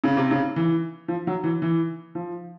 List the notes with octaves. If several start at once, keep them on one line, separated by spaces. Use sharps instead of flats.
C#3
C3
C#3
E3
F3
F#3
E3
E3
F3